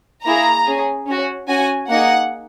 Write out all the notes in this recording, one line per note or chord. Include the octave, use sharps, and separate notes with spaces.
A#3 E4 G#4 A#5
C#4 G#4
C#4 F#4
C#4 F#4 G#5
A#3 D#4 G#4 F#5